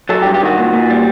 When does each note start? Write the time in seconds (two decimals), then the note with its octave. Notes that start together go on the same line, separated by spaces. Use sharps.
0.09 F#3 A4
0.22 G4
0.26 G2
0.34 G4
0.41 D#3 F#4
0.58 A#2
0.73 A#2
0.90 G3